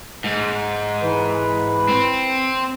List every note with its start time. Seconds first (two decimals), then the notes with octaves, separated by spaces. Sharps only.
0.24 G#2
1.02 E3 B4
1.88 C4